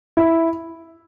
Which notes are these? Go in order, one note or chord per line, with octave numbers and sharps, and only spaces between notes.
E4